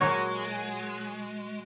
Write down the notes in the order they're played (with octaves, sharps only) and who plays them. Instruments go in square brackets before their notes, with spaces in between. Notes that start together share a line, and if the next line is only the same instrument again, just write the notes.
[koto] A#2 F#3 [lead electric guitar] G#3 [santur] F#4 [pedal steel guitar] C#5 C#6